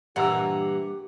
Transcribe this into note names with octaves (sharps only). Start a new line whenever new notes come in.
G2 A#2 E3 G4 F#5 A#5 E6